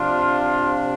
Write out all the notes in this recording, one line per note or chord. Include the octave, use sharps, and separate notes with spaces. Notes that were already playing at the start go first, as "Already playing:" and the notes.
Already playing: C3 F3 D4 F4